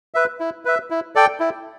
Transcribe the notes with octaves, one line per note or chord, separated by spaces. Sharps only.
B4 E5
E4
B4 E5
E4
A4 D5 G5
E4